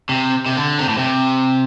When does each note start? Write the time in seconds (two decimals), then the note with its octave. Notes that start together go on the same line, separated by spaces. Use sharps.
0.09 C3
0.46 C3
0.56 D3
0.79 C3
0.89 A2
0.98 C3